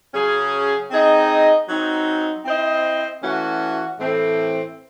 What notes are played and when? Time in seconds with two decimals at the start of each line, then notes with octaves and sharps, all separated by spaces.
0.14 C#3 F#3 C#4 G#4
0.91 C4 D#4 G#4 D#5
1.68 F#3 C4 D#4
2.45 C4 E4 C5 D#5
3.22 E3 A3 C#4 F#4
3.99 A2 E3 A3 C4